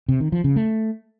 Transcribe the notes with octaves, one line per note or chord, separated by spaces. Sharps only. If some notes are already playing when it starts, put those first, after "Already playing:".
C3
D#3
F3
C#3
A3